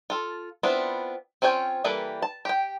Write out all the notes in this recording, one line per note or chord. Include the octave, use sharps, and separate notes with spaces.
F4 A4
B3 C4 D4 E4 F4
C4 C#4 F4 C#5 G5
E3 G3 A#3 A4 B4
A5
G4 G5